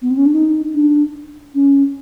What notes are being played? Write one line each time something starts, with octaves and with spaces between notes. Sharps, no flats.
B3
C4
C#4
D4
D#4
D4
C#4